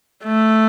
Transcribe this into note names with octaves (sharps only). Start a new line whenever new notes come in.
A3